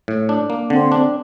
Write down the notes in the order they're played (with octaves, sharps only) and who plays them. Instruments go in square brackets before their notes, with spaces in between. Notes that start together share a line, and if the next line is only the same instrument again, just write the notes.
[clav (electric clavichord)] A2
D4
A#3
[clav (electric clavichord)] D3 [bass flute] C4
[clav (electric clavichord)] D4